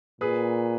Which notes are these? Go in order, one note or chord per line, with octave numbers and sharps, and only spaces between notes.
A#2 G#4 B4